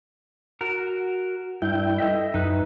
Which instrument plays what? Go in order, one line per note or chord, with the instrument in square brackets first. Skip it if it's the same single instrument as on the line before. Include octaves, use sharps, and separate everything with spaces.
[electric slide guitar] F#4 A#4
[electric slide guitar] G2 [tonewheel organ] E4 G5
[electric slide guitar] A4 D#5 E5
[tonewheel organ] F#2 [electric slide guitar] D#4 B4